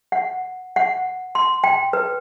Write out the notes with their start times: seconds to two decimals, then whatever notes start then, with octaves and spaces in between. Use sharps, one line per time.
0.12 F#5
0.76 F#5
1.35 C6
1.64 G5
1.93 B4